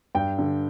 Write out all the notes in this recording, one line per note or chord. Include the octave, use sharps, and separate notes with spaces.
G2 G5
D3